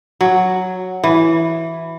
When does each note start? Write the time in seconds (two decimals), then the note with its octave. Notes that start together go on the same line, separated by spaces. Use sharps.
0.21 F#3
1.04 E3